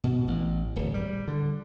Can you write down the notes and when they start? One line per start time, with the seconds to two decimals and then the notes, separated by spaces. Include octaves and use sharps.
0.04 B2
0.28 A1
0.76 D1
0.94 G3
1.28 D3